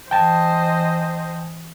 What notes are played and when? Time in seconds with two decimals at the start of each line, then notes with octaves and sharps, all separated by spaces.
0.11 E3 C5 D#5 G5 A5